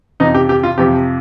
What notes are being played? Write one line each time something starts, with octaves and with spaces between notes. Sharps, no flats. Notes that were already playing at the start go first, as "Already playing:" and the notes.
F2 C3 F3 D#4
G4
G4
F4
F2 C3 F3 G4